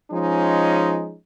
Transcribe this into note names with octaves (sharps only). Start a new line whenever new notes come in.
F3 G#3 C#4 D#4